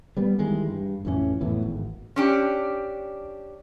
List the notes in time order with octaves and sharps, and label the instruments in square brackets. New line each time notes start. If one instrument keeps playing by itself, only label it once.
[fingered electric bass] G3 B3
D#3 E3 G3 G#3
G2
A1 F2 E3 C#4
F2 A2 E3 B3
G#1
[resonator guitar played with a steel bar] C#4 D4 G4